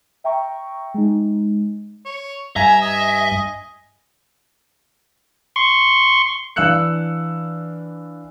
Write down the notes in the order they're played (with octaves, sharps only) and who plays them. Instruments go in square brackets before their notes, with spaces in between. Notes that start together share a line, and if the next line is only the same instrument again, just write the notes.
[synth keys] E5 G5 A#5 C#6
G#3 D#4
[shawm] C#5
[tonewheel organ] G2 [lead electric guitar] E5 [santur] G#5 [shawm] A#5
[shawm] D#5
[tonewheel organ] C6 C#6
[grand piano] E3 D4 F5 E6 F#6 C#7